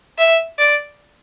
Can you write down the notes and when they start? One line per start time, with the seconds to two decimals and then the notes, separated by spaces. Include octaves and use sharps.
0.18 E5
0.58 D5